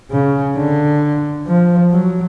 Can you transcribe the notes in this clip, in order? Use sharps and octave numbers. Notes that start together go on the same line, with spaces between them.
C#3
D3
F3
F#3